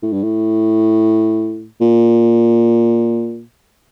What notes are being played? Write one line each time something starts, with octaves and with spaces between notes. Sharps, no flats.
A2
G2
A2
A#2